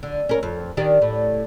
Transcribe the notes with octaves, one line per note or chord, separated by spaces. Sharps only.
D3
C#4 A#4
F2
D#3 D4 G4
A2